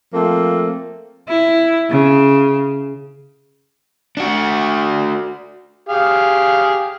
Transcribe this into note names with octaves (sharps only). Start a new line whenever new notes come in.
F3 A3 A#3 C4
E4
C#3
D4 F#4
G4 G#4 F5